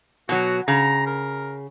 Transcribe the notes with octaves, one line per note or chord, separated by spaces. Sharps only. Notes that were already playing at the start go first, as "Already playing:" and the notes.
B2 F#3 F#4
C#3 A#5
A#4